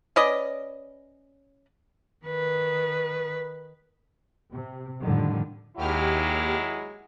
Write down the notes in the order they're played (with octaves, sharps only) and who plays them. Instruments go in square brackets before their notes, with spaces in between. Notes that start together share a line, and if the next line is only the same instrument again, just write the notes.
[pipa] C#4 B4 D5 D#5
[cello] D#3 B4
[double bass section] C3
F2 A2 D3 D#3 G3
[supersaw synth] D#2 G4 F6 [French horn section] F#3 G#3 E4